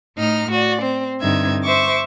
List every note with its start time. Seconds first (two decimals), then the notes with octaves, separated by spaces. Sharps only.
0.17 A2 D#4 F6
0.52 F#4 D5
0.83 C4
1.21 G2 D3 C4 D#4 E5 G#6
1.64 C5 E5 C#6 D6